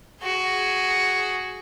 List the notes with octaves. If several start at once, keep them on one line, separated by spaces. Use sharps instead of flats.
F#4 G#4